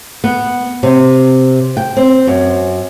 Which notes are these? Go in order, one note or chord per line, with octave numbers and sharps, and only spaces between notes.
B3
C3
G5
C4
F#2